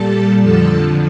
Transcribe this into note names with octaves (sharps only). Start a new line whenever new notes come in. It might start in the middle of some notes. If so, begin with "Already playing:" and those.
Already playing: A#2 G3 A4 A5
F2 D3 F3 A4 A5